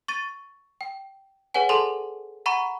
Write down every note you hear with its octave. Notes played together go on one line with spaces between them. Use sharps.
C#6 A6 D#7
G5
G#4 B4 C#5 F#5 G#5
G#4 A4 A5 C6 F#7
F#5 A#5 B5 C#6 D#7